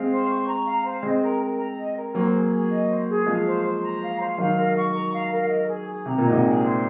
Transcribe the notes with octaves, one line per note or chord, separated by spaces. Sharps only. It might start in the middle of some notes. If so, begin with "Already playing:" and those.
Already playing: G#3 C4 F5
C5
C#6
A#5
F5
C5
G#3 C4 D#5
A#4
A#4
A#5
D#5
A#4
F#3 A#3 C5
G#4
G#4
D#5
C5
G#4
F3 G#3 F5
C5
C5
A#5
F5
C5
D#3 F#3 F5
A#4
C#6
A#5
F5
A#4
D#5
G#4
G#4
C3 A#5
A#2
D#5
G#2 C3
G#4
C5